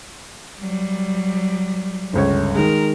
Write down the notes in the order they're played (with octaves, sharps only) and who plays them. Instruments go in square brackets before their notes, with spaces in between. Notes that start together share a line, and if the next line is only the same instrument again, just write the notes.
[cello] F#3 G3
[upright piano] G1 C#2 C#5
[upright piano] D#3 G#3 [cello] A#4